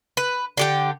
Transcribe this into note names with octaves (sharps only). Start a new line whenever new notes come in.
B4
D3 G4 G5